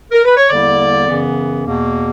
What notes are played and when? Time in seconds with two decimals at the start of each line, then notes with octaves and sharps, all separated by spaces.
0.12 A#4
0.25 B4
0.37 C#5
0.50 E2 D3 G3 A#3 E4 D5
1.07 F#2 C#3 E3 B3
1.66 E2 B2 A#3